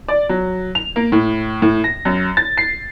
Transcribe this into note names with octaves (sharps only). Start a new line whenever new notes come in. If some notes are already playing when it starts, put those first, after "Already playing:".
D5
F#3
F7
A#3
A2
A2
A#6
F#2
A6
C7